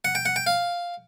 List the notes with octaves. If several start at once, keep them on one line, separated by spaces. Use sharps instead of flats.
F#5
G5
F#5
G5
F5